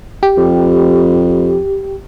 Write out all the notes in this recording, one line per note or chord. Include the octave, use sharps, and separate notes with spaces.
G4
F2